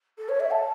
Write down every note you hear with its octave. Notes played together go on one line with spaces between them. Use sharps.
A4
C#5
E5
A5